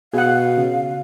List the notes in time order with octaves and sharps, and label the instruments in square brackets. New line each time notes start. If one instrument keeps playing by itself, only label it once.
[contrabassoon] B2 [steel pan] G#4 F#5 [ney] F5
[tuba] C#3